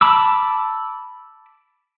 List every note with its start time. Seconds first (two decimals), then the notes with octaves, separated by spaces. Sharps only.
0.01 A5 B5 D6 E6